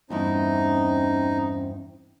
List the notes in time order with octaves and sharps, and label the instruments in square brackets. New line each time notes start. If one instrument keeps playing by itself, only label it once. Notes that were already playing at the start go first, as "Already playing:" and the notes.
[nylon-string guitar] E2 G2 E4 [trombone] C4 [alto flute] C#4 [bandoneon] D#4